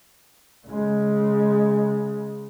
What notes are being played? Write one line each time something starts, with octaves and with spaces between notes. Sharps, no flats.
C#3 G#3